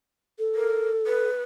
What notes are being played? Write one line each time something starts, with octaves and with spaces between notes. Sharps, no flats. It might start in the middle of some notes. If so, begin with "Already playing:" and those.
A4
A#4
B4